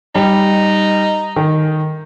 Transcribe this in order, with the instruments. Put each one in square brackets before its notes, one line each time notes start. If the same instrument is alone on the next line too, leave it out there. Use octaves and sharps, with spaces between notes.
[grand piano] G3 [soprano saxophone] D#4
[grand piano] D#3